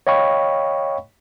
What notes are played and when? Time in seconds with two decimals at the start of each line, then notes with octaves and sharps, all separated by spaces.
0.07 C#5 D#5 F5 G5 B5 C#6